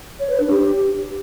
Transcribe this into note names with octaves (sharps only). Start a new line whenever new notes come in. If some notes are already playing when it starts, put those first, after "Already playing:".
C#5
B4
D4
G4